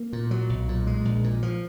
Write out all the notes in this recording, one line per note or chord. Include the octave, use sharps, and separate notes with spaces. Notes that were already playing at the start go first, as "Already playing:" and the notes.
Already playing: A#3
A#2
F#3
B1
A#2
G#3
A#1
A#2
F3